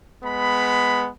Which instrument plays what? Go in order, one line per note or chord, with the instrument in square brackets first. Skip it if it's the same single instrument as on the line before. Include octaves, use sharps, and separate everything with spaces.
[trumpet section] G#3 B3 B5